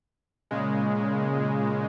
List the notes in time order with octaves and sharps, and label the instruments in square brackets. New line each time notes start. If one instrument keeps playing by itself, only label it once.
[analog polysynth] A#2 C#3 G#3